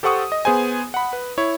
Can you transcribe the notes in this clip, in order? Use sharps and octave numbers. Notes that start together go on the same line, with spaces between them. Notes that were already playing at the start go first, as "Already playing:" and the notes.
G4 A4 C5 F#5 C#6 D#6
D#5
B3 G#4 C5 G#5
F#5 B5
B4
E4 C#5